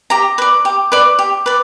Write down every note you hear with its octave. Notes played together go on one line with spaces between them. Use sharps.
G4 A#5
B4 D5
G4
B4 D5
G4
B4 D5